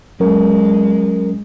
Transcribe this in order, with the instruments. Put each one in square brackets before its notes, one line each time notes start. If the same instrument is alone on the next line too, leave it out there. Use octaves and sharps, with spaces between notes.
[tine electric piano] F#3 C#4 A#4 [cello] G#3